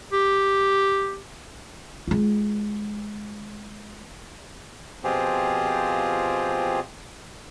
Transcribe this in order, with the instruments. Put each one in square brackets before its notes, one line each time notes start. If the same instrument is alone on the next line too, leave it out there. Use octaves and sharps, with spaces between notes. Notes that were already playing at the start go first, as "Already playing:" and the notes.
[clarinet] G4
[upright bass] G#3 F4
[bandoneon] B2 F3 C4 F4 G4 G#4